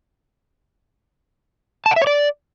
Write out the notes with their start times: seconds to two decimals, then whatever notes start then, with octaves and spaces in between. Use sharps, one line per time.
1.86 A5
1.91 F#5
1.96 E5
2.02 C#5
2.07 D5